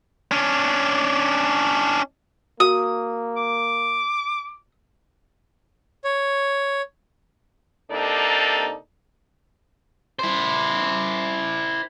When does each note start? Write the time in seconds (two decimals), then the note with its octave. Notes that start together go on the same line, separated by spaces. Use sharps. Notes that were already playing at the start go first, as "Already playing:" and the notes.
0.31 C#4 D4
2.60 A#3 F#4 D#6
3.37 D6
6.04 C#5
7.91 C3 A#3 D4 D#4 A4 D5
10.19 E4 C5